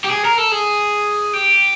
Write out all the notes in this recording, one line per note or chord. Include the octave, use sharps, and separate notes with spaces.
G4
G#4
A#4
A4
G#4
G4